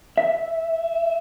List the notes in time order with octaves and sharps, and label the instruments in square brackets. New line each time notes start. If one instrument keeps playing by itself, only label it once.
[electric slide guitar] E5